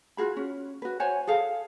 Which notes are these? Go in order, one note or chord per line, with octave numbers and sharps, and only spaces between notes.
F4 F#4 G#4 B5
C#4
F#4 B4
C5 C#5 F#5 G#5
G#4 A4 F5